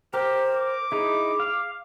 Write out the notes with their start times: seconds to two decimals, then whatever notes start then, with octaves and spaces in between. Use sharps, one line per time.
0.14 G4 A#4 C5
0.56 D6
0.92 D#4 E4 G#4
1.40 F5